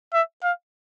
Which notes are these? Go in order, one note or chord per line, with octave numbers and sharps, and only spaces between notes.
E5
F5